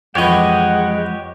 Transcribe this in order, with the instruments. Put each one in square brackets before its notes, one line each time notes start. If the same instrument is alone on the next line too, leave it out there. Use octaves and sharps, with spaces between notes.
[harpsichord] F2 E3 [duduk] G#3 [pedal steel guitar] G4 C#5 D#5 [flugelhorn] F#5